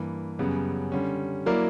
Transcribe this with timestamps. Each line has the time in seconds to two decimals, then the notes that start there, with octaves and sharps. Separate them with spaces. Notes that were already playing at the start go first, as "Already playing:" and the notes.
Already playing: G2 E3 A#3
0.39 F#2 C#3 G3 B3
0.92 D3 G3 C#4
1.46 F#3 A#3 E4 A#4 D5